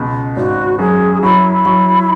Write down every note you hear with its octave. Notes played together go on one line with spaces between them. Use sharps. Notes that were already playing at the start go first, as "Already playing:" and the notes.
Already playing: C#2 B2
G#1 F#4
F#2 G#4
F#3 E4
F#3